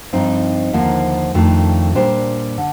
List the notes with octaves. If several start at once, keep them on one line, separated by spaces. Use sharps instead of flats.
G2 F3 C4 D#4
D#2 D3 F3 A#3
F2 D#3 A3 D4 F4
A#2 G3 D4 G4 C5
D3